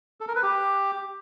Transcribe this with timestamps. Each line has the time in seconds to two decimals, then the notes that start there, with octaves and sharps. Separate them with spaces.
0.21 A4
0.28 A#4
0.35 B4
0.43 G4